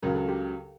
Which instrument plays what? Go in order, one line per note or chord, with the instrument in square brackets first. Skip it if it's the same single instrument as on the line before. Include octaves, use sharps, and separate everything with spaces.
[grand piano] C#2 C#3 F#3 [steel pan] A#4
[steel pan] A4
G4